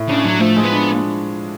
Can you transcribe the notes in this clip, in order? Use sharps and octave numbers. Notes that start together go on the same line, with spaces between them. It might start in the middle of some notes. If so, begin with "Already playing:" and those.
Already playing: A2
C#3 D4
A2 F#3
F3 A3
G#3
B3
D4